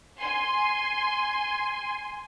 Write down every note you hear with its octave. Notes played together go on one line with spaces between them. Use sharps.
G#5 C6